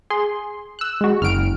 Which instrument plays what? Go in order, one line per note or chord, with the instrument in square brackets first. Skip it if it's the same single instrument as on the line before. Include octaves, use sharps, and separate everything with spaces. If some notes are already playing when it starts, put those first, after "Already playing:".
[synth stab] G#4 C6
E6 F#6
G#3 F#4
[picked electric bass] F#1 [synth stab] F6 D7